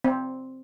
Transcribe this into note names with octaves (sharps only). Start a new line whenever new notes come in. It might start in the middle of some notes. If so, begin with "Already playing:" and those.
C4